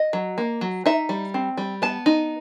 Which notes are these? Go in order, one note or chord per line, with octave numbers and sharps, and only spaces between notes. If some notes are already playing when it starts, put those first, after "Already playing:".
Already playing: D#5
F#3
A#3
F#3
D#4 E5
G3
C4
G3
B3 A5
D#4